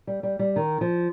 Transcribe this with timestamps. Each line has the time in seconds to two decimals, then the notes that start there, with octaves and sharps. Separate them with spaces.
0.07 G3
0.23 G3
0.39 G3
0.56 D#3
0.81 F3